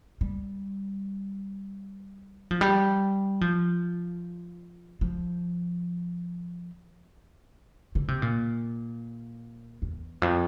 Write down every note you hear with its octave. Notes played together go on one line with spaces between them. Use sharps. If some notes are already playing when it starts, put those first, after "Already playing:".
G3
F3
G3
F3
F3
D3
C3
A#2
E2
F2